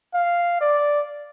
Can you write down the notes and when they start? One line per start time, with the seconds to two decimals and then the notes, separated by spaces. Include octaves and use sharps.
0.14 F5
0.61 D5